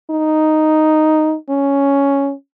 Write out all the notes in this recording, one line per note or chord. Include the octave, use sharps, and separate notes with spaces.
D#4
C#4